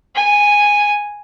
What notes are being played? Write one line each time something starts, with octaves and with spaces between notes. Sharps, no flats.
G#5